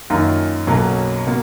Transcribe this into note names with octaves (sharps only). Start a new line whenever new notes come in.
F#2 D#3 A#3 C#4 F4
B1 B2 F#3 A#3 C#4
B2 A#3